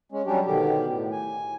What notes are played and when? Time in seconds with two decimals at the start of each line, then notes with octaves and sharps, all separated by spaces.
0.12 G#3 C#4
0.26 F#3 G3 C#4 D4 G4
0.46 B2 D3 D#3 G4
0.89 A2
1.12 G#5